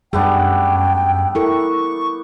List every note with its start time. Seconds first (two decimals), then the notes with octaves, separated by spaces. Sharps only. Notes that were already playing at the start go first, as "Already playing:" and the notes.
0.13 F#2 G3 A3 B3 D4 G#4 G5
1.35 E4 A4 A#4 C#6